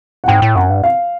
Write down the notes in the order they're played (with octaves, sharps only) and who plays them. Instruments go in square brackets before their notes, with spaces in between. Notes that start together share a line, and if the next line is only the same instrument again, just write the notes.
[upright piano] F#5
[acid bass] G#2 [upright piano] G5
[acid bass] A2
[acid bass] F#2 [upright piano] F#5
[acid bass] G2
[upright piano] F5